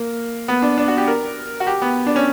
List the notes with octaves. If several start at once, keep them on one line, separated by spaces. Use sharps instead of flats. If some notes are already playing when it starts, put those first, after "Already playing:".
Already playing: A#3
B3
D4
D4
F#4
G4
A#4
F#4
G4
B3
D4
C#4